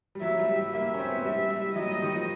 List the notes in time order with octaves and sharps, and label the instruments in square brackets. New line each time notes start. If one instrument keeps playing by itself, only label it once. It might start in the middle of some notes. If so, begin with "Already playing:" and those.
[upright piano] G3
[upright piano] F#3 [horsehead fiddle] E5
[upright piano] G3
G3
[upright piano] A#3 [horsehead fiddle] E5
[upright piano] C#4
C4
B3
[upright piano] G3 [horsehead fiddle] E5
[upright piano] G3
[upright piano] F#3 [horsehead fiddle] D#5
[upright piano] G3
D#3
F3